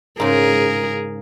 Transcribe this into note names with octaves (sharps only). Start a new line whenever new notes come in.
G#2 C#3 G#4 A#4